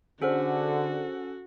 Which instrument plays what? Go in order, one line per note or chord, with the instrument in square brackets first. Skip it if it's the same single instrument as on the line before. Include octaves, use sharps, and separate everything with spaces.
[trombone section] D3 [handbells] C#4 A4 F#5 [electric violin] F#4 [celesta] G#4 C5